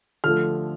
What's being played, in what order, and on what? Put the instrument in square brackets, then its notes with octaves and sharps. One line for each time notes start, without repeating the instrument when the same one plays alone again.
[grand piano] D3 F3 A3 F6